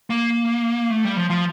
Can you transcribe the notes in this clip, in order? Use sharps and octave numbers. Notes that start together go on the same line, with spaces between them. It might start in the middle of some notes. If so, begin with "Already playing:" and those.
A#3
A3
G3
F3
F3